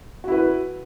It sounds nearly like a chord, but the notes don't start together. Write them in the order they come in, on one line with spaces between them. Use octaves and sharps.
F#4 E4 B4